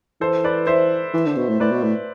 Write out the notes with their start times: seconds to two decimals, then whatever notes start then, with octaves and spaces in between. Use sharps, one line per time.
0.21 E3 A4 C5
0.44 B4 D5
0.67 C5 E5
1.14 E3
1.26 D3
1.37 B2
1.49 A2
1.60 A2 B4 D5
1.71 B2
1.83 A2